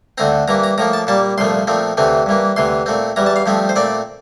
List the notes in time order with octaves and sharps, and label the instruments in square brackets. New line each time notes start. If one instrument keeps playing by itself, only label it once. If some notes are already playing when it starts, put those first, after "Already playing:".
[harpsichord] D2 D3 A3 C4 A#5
G2 E3 A#3 A#5
A#5
A2 F3 A#3 A#5
A5
A#2 G3 A#3 A5
C2 A#2 F3 A3 C6
A#2 F3 A3 C4
D2 C3 E3 A3 C4
G2 E3 A#3
D2 C3 E3 C6
A#2 A3 C4
E2 E3 G3 A#5
A5
F5
G2 F3 A3 C4
C5
A#2 A3 C4 D5